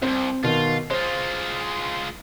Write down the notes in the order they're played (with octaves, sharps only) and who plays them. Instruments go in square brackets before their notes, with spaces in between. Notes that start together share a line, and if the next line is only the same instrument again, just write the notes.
[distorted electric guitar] C2 G#2 [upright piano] C4
[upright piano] B2 D#3 [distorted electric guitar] F4
[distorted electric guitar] G#3 F4 [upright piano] C5